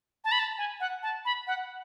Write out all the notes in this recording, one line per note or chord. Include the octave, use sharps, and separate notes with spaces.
A5
B5
A5
G#5
F#5
A5
B5
F#5